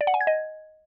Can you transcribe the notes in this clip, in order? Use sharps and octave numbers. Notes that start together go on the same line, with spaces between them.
D5
F#5
G#5
G#6
D#5